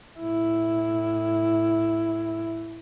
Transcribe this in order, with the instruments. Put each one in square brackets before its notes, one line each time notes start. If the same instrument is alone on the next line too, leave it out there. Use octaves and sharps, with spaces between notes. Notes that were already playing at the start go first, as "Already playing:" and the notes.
[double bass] A2 E4